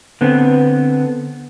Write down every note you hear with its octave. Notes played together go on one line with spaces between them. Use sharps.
D3 B3 C4